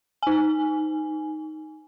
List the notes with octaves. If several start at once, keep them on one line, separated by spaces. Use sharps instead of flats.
D#4 G#5